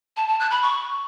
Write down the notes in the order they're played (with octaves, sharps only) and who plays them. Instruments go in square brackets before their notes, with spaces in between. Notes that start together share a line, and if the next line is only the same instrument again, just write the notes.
[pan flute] A5
A5
F#6
B5
C#6